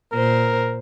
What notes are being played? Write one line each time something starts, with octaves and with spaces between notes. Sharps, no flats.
A#2 A#4 C5